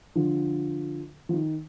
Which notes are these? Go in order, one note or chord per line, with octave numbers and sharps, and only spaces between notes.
D3 F3
F3
D#3